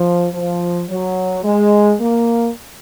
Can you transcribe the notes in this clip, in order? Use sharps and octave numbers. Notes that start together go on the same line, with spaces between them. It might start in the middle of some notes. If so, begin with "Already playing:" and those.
Already playing: F3
F3
F#3
G#3
A#3